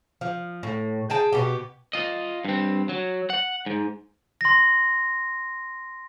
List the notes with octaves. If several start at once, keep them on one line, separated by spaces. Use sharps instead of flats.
F3
A2
G#4 G5 A5
B2 B3 G4
F4 D#5
G2 C4
F#3
F#5
G#2
C6 A#6